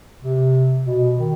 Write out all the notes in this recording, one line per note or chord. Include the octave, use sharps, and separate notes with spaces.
C3
B2
D#3